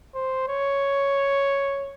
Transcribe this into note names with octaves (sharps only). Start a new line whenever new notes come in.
C5
C#5